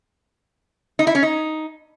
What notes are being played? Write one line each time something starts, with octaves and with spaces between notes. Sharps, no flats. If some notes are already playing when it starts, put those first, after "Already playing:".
D#4
E4
C#4
D#4